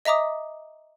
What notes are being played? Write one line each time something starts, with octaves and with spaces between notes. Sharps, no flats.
D#5 E5 A#5 D6 D#6